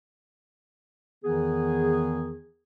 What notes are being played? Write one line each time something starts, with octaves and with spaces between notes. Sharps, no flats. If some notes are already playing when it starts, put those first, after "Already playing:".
E2 D#3 E3 B3 G#4